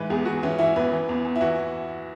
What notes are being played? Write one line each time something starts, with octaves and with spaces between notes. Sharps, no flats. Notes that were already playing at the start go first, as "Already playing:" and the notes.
Already playing: G#2 E3 B4
E2 G#4
E2 F#4
E3 C#4
E3 E4
E2 B4
E3
E2
E2
E4
E3 F#4